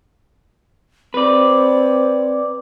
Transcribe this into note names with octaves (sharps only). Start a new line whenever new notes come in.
C4 B4 D5